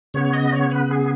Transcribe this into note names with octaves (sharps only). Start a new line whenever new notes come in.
C#3 B3 C#5
D#5
C#5
B4
G#4